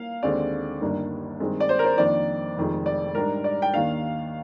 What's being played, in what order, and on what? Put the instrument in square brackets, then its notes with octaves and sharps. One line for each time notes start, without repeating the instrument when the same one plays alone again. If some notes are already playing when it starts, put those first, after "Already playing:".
Already playing: [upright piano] A#3 F5
D#2 D3 G#3 C4 D5
G1 G2 D#3 A#3 D4
G2 D#3 G#3 C4
D5
C5
A#4
C5
F2 D#3 A#3 D4 D5
F1 F2 D#3 G#3
D5
G#2 G3 D4 A#4
D5
G5
D#2 D#3 A#3 D4 F5